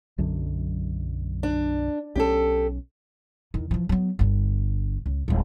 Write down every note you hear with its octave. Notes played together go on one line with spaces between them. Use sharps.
B1 F#2 D3
D4
B1 C#4 G4 A4
E2 D#3
E3 F3
F#3 B3
G1 D3
C#2
D1 G#3